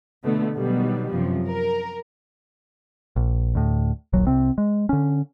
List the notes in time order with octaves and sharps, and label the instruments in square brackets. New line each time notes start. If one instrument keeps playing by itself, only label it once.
[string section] B2 D3 A3 B3
B2 D#3 F#3 G3 B3
F#2 C3 F3
A#4
[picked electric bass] A#1
D2 A2
D#1 A#1 F#3
C2 C3 C4
G#3
D3 C#4